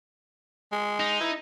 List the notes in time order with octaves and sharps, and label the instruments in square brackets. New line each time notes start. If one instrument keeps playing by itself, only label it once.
[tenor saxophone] G#3
[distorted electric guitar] D#4
[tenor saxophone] E4